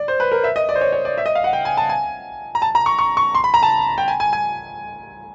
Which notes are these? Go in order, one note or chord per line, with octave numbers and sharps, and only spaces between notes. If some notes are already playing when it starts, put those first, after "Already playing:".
Already playing: D5
C5
B4
A#4
E5
D#5
D5
C5
C#5
C#5
D5
E5
D#5
F5
F#5
G5
G#5
A5
G#5
A#5
A5
A#5
C#6
C#6
C#6
C6
B5
A#5
A5
G5
G#5
G#5
G#5